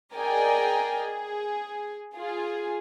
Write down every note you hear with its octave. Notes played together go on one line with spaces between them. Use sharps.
G#4 A#4 D5 D#5 G5 G#5
G#4
F4 G#4